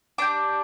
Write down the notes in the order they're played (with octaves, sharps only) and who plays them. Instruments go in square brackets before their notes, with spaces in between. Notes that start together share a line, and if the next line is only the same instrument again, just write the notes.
[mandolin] D4 G4 D6